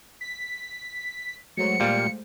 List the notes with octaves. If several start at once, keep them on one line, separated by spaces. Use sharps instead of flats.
B6
F#3 G#3 A3 C5 C#7
A#2 G3 F5